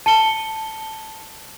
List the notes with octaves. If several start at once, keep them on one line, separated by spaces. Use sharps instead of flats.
A5 C#7 G7